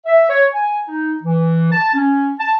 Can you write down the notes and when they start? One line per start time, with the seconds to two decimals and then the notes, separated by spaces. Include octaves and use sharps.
0.06 E5
0.29 C#5
0.53 G#5
0.86 D#4
1.23 E3
1.71 A5
1.95 C#4
2.39 A5